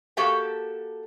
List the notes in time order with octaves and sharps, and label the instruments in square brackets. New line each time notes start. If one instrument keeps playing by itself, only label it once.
[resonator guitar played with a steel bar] A#3 F#4 G4 A4 E5 G5